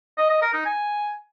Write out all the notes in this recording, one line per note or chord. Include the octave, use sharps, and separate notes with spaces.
D#5
D#5
A#4
D#4
G#5